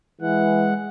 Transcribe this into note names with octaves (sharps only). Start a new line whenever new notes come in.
E3 G#3 F#5